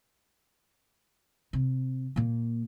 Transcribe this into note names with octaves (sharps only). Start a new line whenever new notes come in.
C3
A#2 A#3